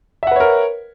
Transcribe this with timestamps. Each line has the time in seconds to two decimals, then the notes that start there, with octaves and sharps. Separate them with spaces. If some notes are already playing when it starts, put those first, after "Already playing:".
0.23 E5
0.27 F#5
0.31 B4
0.36 C#5
0.40 A#4